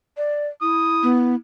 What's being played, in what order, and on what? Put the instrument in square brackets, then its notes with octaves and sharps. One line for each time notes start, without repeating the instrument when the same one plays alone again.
[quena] D5
[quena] E4 [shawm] D#6
[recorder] B3